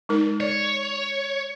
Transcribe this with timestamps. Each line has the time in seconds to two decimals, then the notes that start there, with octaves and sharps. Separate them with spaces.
0.09 G#3 D#4 A#4
0.40 C#5 D5